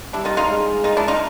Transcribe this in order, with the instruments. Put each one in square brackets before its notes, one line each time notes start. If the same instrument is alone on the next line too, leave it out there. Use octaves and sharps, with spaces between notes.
[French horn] G3 [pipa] D4 E4
[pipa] D#4 F4
D#4 F4
[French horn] G#3
[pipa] D#4 F4
D4 E4
D#4 F4